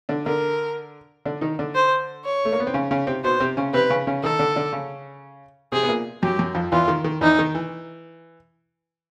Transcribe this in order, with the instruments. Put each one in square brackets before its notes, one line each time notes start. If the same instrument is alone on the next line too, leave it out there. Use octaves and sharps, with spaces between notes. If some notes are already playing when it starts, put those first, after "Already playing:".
[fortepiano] D3 D4
[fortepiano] D3 D4 [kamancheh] A#4
[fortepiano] D3 D4
D#3 D#4
D3 D4
[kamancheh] C5
C#5
[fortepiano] A3
A#3
B3
C4
C#3 C#4
C#3 C#4
C3 C4
[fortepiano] B2 B3 [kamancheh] C5
[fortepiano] C3 C4
C#3 C#4
[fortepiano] C3 C4 [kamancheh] B4
[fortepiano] C#3 C#4
C#3 C#4
[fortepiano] D#3 D#4 [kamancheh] A4
[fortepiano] D3 D4
D3 D4
C#3 C#4
[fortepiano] C3 C4 [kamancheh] G#4
[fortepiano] B3
A#2 A#3
[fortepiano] F#2 F#3 [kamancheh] G4
[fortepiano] F#2 F#3
F2 F3
[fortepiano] E2 E3 [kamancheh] F4
[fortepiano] D#3
D#3
[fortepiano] E2 E3 [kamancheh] D#4
[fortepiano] D#3
E3